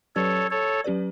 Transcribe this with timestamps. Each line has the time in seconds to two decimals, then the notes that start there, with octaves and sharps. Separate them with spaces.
0.16 F#3 C#4 G4 A4 B4 C#5 D5
0.51 A4 C#5
0.84 F#3 C#4 G4 B4 D5